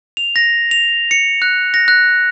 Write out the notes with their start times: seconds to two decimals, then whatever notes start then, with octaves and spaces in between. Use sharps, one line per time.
0.17 F7
0.36 A#6
0.71 F7
1.11 C#7
1.42 F#6
1.74 A#6
1.88 F#6